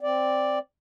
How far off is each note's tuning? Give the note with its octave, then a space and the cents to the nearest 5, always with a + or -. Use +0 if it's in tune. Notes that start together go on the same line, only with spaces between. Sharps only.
C4 +5 D5 +0